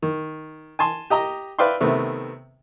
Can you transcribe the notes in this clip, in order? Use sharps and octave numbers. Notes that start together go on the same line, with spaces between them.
D#3
G#5 A5 C6
G4 D#5 A#5 D#6
B4 D5 E5 F5 G5 C6
C3 D#3 A3 B3